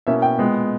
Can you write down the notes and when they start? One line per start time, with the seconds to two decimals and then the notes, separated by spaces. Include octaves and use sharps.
0.07 B2 A#3 C#4 E4 E5
0.22 G5
0.38 A#2 G#3 B3